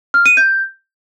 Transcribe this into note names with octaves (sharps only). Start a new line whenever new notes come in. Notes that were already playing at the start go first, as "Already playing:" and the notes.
F6
D#7
G6